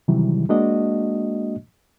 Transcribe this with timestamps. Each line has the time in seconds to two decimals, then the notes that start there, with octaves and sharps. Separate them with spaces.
0.08 C3 D#3 E3 F#3 G3 E4
0.49 G#3 A#3 D4 F#4 D#5